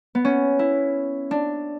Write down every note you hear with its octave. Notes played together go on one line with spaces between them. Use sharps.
B3
C#4
E4
D4